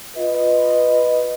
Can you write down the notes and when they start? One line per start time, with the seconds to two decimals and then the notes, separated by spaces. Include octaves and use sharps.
0.16 F4 B4 D#5